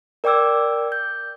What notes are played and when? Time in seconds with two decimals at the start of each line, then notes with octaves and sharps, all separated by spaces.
0.24 A#4 D5 G5 D6 E6 G#6
0.92 G6